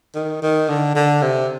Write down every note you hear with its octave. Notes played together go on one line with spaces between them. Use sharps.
D#3
D#3
D3
D3
C3